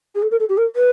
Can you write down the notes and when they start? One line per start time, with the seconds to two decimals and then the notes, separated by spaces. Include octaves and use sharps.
0.15 G#4
0.22 A4
0.31 A#4
0.40 A4
0.49 G4
0.57 A#4
0.76 B4